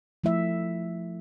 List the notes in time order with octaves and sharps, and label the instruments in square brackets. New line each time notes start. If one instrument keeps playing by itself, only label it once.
[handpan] F3 A3 E4 E5